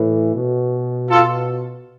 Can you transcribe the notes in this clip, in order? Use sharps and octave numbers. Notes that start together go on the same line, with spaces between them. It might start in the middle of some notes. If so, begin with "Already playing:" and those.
Already playing: A2 E3
B2
F4 A4